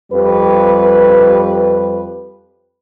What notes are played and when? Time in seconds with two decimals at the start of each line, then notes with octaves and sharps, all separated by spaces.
0.12 F2 G3 G4 B4